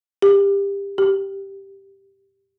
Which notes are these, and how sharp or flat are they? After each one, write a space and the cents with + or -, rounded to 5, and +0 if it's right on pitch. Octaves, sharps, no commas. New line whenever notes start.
G4 +25
G4 +0